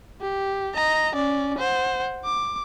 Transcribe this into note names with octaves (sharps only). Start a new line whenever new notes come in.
G4
D#5 A#5
C#4 D5
C5 F#5
D6